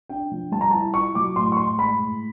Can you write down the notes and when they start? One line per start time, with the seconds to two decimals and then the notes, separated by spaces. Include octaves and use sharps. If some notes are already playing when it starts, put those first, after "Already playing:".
0.09 D4 G5
0.31 F3
0.52 G3 A5
0.61 A#5
0.71 E4 A5
0.94 F4 C#6
1.15 F#3 D6
1.36 A2 C6
1.52 C#6
1.57 A2 C6
1.78 G#3 B5
1.99 A2